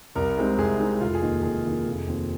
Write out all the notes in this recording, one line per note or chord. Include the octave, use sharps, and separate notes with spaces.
C2 A#4
C3 G#3 C4 D#4
C2 G#4
C3 G#3 C4 D#4
F1 F4
G#4
D#2 D#3 A#3 D#4
F1 G#4
D#2 D#3 A#3 D#4
F1
D#2 D#3 C4 F4